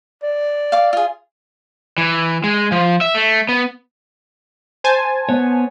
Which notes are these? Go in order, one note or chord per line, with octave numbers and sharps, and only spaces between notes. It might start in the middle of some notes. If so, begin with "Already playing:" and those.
D5
F5 D6
F4 G#4
E3
G#3
F3
E5
A3
B3
C5 G#5 A5
B3 C#5